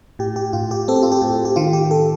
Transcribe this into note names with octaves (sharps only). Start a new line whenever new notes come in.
A2 G4
G4
A2 F4
G4
C4 A4
G4
F4
G4
A2
G4
D#3 F4
G4
A4